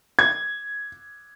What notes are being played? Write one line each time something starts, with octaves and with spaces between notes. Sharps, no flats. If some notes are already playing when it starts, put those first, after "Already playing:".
G#6